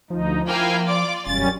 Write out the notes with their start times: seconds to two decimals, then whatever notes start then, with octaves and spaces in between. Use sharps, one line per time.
0.10 D2 F3 D#4
0.47 A#3 E4 F5 G5 G#5
0.85 F4 D5 D6
1.27 E1 F#2 G3 C#4 A6